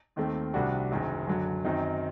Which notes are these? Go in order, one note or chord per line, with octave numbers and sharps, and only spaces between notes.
D#2 D#3 A3 C4
C2 C3 G3 D4 F#4
F#1 F#2 D#3 F#3
F#2 D3 F#3
F#2 D#3 F#3 C4 D#4